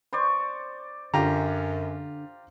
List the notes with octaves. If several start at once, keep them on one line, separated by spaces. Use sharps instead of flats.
C5 D5 C#6
F#2 D3 F4 G4 A#5